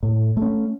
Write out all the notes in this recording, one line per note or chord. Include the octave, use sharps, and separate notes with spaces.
A2
A3
C#4